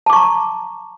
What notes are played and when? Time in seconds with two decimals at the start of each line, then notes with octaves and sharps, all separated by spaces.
0.06 A5
0.10 D6
0.13 C#6
0.16 A#5